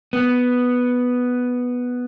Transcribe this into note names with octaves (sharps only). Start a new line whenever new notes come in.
B3